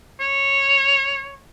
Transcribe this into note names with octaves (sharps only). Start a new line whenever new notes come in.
C#5